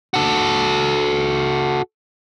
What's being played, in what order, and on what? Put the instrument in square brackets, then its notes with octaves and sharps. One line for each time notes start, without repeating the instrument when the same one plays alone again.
[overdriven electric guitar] F#4 A4